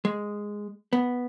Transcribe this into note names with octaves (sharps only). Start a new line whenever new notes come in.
G#3
B3